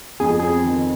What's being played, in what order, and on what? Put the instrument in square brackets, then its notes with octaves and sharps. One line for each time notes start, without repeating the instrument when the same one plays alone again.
[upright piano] F2 [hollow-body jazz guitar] G#4
[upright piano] C4 [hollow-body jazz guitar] G#4
[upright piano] D#3